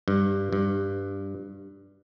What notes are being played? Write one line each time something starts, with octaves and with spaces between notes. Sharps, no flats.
G2
G2